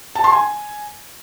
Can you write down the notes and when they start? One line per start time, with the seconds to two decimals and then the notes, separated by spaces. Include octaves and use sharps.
0.15 A5
0.24 C6
0.32 G#5